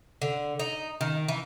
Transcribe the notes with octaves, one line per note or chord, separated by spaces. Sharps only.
D3
D#4
D#3
E3